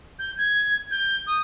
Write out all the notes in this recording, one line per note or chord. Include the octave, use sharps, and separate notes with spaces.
G6
G#6
G6
D#6